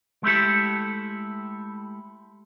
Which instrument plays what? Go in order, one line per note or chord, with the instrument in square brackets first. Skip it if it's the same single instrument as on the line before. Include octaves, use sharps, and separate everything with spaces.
[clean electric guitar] G#3 A3 E4 G4 A4